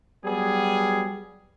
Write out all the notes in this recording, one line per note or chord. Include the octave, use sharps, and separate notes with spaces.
F#3 G3 B3 G#4